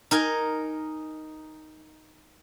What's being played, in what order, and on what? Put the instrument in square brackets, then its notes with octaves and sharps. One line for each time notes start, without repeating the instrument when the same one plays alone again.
[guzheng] D#4 A#4 G#5